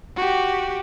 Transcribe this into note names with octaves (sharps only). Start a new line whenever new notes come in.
F#4 G4